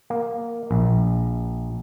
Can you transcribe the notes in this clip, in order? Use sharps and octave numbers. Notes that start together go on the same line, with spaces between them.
A#3
A#1